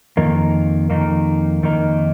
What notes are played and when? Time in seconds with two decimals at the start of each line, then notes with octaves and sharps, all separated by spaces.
0.17 F2 D#3 A#3 D#4
0.90 F2 D#3 A#3 D#4
1.63 F2 D#3 A#3 D#4